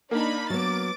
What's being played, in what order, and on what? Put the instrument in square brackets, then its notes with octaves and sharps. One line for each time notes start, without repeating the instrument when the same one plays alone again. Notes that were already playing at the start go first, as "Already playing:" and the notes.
[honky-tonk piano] A#3 [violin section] D4 D#4 B5
[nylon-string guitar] F#3 B3 [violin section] D6 A6